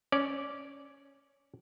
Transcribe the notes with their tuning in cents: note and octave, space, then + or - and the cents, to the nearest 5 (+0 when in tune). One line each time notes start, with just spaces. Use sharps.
C#4 +0 D5 -10